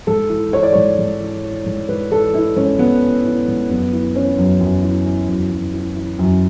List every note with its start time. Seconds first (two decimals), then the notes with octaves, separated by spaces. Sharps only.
0.07 G#2 A4
0.30 E3
0.53 E3 C#5
0.63 D5
0.73 G#2 C#5
0.99 G#2
1.21 E3
1.44 E3
1.66 G#2
1.88 G#2 B4
2.11 E3 A4
2.34 E3 E4
2.56 G#2 C#4
2.79 G#2 B3
3.01 E3
3.25 E3
3.48 G#2
3.70 F#2 B3
3.93 E3
4.15 E3 C#4
4.38 F#2
4.61 F#2
4.83 E3
5.06 E3
5.29 F#2
5.51 F#2
5.73 E3
5.96 E3
6.19 F#2